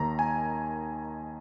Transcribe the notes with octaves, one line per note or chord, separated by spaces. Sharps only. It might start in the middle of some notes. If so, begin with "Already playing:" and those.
Already playing: D#2 D#3 A#5
G#5